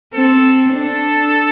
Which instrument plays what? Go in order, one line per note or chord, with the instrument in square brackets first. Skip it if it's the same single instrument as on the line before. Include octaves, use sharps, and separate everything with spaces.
[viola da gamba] C4 [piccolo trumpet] A4
[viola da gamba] D4 [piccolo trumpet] A4